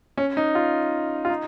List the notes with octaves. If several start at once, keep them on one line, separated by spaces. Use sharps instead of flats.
C#4
D#4
F4
F4
D#4